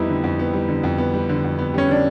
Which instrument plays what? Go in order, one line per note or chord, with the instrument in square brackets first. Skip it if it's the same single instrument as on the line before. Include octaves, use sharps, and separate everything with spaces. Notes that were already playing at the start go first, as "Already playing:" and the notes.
Already playing: [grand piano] F2 G3 B3 [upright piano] D#4 E4
[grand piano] D3
F2
B3
G3
D3
F2
B3
G3
D3
F2
B3
[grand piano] G3 [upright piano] C#4
[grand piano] D3 [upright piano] D4